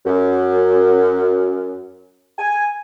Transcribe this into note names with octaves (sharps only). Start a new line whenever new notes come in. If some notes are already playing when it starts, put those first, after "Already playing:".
F#2
G#5